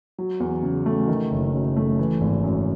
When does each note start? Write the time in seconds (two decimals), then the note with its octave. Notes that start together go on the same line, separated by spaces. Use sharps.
0.18 F#3
0.40 E2
0.63 C#3
0.86 A3
1.08 D#3
1.31 F#1
1.53 F#2
1.76 A3
1.99 E3
2.21 G#1
2.44 F#2